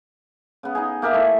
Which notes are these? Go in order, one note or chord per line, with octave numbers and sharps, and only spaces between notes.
C#3 B3
D#4 G#4
A#3 G4 A#4 E5
A3 E4